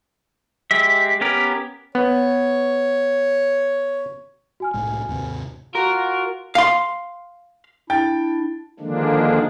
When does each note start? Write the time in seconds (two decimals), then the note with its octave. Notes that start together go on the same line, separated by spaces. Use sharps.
0.71 G#3 G4 E5
1.21 B3 C#4 G4 A#4
1.95 B3 C#5
4.60 F#4 G#5 F6
4.74 C2 A2 G#3
5.08 D#2 G#2 C3
5.75 F4 F#4 A#4
6.55 F5 C6
7.90 D4 E4 G5 A6
8.80 D3 D#3 F3 G#3 A#3 D4